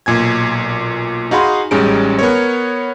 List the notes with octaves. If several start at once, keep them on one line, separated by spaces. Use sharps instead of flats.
B1 A#2 G#5 G#6
D#4 F#4 G#4 F5 B5 C6
A1 G3 G#3 C#4 D#4 D7
B3 A#4 C#5